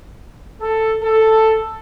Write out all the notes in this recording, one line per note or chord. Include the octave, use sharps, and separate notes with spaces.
A4
A4